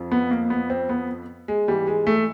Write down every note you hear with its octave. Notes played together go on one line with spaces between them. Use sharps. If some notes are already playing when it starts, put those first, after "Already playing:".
Already playing: F2 F3
B3
A#3
B3
C4
B3
G#3
G#2 E3 G3
G#3
A3